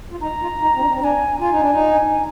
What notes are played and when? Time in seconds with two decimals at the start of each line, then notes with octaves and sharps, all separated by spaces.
0.11 F4
0.21 D#4 A#5
0.41 F4
0.61 D#4
0.75 C4
0.80 D4
0.92 C4
1.00 D4 A#5
1.04 G#5
1.40 F4 G#5
1.51 D#4
1.60 D4
1.71 D#4